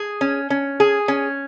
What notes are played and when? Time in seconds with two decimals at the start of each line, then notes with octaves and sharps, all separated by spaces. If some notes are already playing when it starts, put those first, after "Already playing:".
Already playing: G#4
0.21 C#4
0.50 C#4
0.80 G#4
1.08 C#4